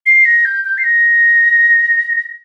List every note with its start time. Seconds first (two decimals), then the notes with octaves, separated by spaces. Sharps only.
0.06 C7
0.25 A#6
0.45 G6
0.65 G6
0.78 C7
0.84 A#6